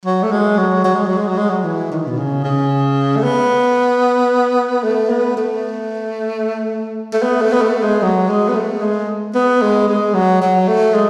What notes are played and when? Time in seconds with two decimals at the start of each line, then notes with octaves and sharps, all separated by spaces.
0.05 F#3
0.23 A3
0.32 G#3
0.58 F#3
0.84 F#3
0.95 G#3
1.06 F#3
1.17 G#3
1.28 F#3
1.37 G#3
1.49 F#3
1.64 E3
1.92 D#3
2.07 B2
2.18 C#3
2.44 C#3
3.17 A3
3.24 B3
4.84 A3
5.10 B3
5.37 A3
7.13 A3
7.23 B3
7.42 A3
7.53 B3
7.62 A3
7.83 G#3
8.03 F#3
8.29 G#3
8.49 B3
8.56 A3
8.82 G#3
9.35 B3
9.62 G#3
9.89 G#3
10.14 F#3
10.42 F#3
10.68 A3
10.94 G#3